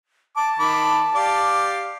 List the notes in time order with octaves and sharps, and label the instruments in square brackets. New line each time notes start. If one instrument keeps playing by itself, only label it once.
[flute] A5 [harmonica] D6
[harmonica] D#3 B5 D6
G4 D5 F5